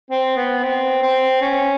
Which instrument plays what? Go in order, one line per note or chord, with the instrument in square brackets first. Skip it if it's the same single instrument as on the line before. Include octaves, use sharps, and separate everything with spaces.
[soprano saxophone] C4
B3
C4
C4
C#4